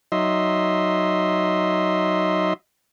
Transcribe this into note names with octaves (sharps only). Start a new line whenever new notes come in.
F#3 D#4 D#5 E5 C6